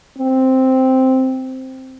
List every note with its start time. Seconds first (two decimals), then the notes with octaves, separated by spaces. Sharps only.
0.18 C4